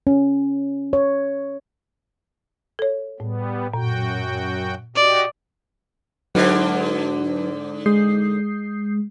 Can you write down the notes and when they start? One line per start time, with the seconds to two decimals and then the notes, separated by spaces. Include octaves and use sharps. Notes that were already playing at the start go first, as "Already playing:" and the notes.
0.07 C#4
0.93 C#5
2.79 A4 C#5
3.20 A2 G3 B3
3.74 F#2 A#2 F#4 G5
4.96 F#4 G4 D5 D#5
6.35 G#2 D3 F#3 F#4 B4
7.86 G#3 D#6 G6 C7